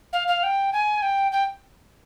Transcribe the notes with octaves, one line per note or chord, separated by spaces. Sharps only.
F5
F5
G5
G#5
G5
G5